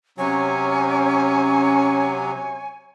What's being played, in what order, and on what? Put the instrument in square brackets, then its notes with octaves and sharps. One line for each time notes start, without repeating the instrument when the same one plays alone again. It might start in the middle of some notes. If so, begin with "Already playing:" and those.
[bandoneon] C3 F#3 [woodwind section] C#4 [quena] C#5 [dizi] G#5